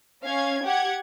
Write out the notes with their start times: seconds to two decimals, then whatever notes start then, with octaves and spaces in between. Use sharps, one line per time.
0.22 C#4 F5 G#6
0.64 G4 F#5 G#6